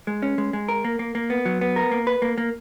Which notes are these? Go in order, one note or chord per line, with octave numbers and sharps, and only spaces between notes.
G#3
C#4
G#3
G#3
A#4
A#3
A#3
A#3
B3
F#3
B3
A#4
A#3
B4
A#3
A#3